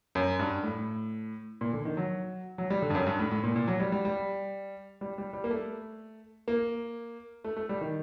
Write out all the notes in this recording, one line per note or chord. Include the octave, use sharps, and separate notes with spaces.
F#2
G2
A2
A#2
D3
D#3
F#3
F#3
G3
D3
G2
F#2
G2
A2
A2
A#2
A#2
F#3
G3
G3
G3
G3
G3
G3
A#3
A3
A#3
A3
A3
G3
D#3